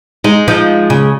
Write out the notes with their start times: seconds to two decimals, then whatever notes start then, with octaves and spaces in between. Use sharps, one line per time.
0.24 G#3 D#4
0.48 F3 D#4
0.90 C#3